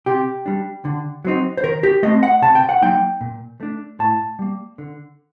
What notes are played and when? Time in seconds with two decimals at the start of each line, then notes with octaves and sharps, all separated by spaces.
0.06 C3 G4
0.46 G3 D4
0.85 D3
1.25 F#3 C4 D#4
1.57 C5
1.64 D#3 A#4
1.83 G4
2.03 A3 C4 D#5
2.23 F#5
2.42 C3 A5
2.55 G5
2.69 F#5
2.82 F#3 A#3 D#4 G5
3.21 A#2
3.60 A3 D4
3.99 A2 A5
4.39 G3 A#3
4.78 D3